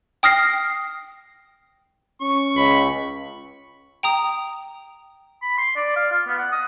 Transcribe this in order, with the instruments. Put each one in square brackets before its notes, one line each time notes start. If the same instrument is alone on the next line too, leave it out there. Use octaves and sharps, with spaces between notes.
[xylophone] G5 D#6 F6 A#6 C7
[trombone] C#4 [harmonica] C#6
[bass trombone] C#2 [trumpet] B5
[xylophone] G5 A#5 D#6
[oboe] B5
C6
D5
F5
F4
B3
F#5
D#6